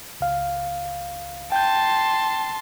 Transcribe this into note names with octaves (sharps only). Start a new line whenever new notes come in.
C#2 F5
G5 A5 C6 G6